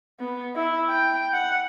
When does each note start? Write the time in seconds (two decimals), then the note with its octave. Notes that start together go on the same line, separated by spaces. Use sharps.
0.20 B3
0.56 E4
0.89 G5
1.33 F#5